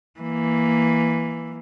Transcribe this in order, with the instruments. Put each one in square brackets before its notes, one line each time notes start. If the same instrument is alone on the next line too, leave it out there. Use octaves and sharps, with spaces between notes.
[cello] E3 A#3